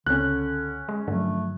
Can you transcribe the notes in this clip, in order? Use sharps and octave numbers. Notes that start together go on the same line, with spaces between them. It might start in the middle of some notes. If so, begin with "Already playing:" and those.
C#2 D3 C#4 F#6
G#3
G2 D3 F3 F#3 A3